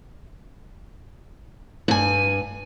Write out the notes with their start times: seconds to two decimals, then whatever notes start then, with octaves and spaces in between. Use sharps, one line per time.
1.88 G2 G#5